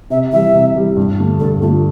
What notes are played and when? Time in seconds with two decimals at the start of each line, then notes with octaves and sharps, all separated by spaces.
0.10 C3 E5
0.32 E3 G3 E5
0.54 C3
0.75 E3 G3
0.96 G2
1.19 D3 A3
1.40 G2 A4
1.61 D3 A3 F4